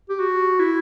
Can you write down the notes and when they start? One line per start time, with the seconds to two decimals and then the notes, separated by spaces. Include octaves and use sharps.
0.09 G4
0.19 F#4
0.59 E4